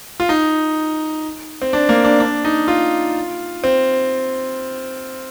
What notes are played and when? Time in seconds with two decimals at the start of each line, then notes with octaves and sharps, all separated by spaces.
0.20 F4
0.29 D#4
1.62 C4
1.73 D4
1.89 A#3
2.04 D4
2.20 D4
2.45 D#4
2.68 F4
3.64 C4